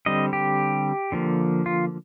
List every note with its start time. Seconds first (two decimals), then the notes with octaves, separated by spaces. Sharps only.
0.06 D3 G3 C4 D#5
0.33 G4
1.12 D3 F3 A#3
1.66 F4